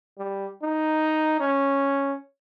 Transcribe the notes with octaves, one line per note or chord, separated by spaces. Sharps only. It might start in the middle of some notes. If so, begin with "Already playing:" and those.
G3
D#4
C#4